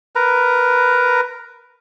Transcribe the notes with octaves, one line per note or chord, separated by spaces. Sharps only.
A#4 B4 A#5